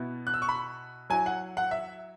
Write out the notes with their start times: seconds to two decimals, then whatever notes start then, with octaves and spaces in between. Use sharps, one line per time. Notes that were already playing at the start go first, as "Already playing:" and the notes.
Already playing: B2 B3 E4
0.27 F#6
0.34 E6
0.42 C#6
0.49 B5
1.10 F#3 E4 G#5
1.26 F#5
1.57 F#5
1.71 E5